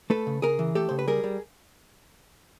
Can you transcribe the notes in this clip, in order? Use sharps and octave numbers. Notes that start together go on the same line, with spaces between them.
A3 A4 B4
C#3
C#3 G#4 A#4
E3
A3 G4 A4
C#3 C5
B4
G3 G#4 A#4
G3